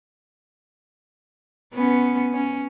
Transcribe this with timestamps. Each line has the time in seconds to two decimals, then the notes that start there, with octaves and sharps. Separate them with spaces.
1.74 B3 C#4
2.33 C#4